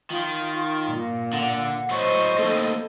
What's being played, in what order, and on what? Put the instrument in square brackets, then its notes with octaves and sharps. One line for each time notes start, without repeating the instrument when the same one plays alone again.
[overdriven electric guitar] D#3 [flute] F4
[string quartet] A#2
[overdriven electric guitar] D3 [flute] F#5
[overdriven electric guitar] A2 F#3 [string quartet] C5 D#5 [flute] C#6
[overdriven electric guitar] D#2 A2 [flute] A4